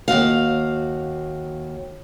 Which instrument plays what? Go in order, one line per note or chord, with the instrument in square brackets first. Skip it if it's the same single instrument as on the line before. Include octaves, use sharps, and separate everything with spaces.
[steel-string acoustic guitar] D#2 C3 F#4 F5